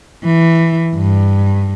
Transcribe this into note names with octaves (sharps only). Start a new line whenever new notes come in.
E3
G2